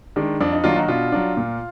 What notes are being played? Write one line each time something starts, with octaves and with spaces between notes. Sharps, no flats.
D#3 G#3 D4
F2 D4
D#4
D#3 F#3 A#3 D4 F4
D#4 F#4
B2 D4 F4
F#3 D4
A#2